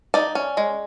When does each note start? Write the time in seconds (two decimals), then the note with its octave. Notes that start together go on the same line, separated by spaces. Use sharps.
0.14 D#4 D5
0.35 C#4
0.57 G#3